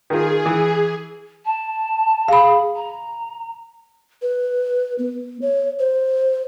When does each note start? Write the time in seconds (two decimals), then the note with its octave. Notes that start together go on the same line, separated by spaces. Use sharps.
0.10 D#3 F4 G#4
0.46 E3
1.45 A5
2.28 G#4 F5 B5
2.76 A#5
4.22 B4
4.98 B3
5.42 C#5
5.79 C5